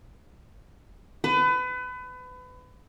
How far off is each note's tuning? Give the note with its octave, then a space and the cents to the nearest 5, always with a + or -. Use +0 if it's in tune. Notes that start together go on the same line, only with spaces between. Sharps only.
B4 +30